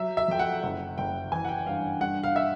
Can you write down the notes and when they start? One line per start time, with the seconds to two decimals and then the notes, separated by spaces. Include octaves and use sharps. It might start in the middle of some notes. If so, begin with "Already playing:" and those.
Already playing: F#3 E5
0.17 E5
0.28 F2 G5
0.39 F#5
0.63 F#1
0.98 F#1 G5
1.32 E3 G#5
1.45 F#5
1.49 G5
1.66 G2 F5
2.00 G2 F#5
2.23 F5
2.36 E5